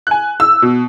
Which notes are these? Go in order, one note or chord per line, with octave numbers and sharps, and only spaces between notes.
G#5 F#6
E6
B2